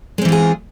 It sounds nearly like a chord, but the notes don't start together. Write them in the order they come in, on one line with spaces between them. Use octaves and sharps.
G#3 C4 E3 F4 G#4